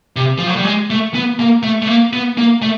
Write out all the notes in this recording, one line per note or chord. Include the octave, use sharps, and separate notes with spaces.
C3
F3
F#3
G3
G#3
A3
B3
A#3
A3
A3
A#3
B3
A#3
A3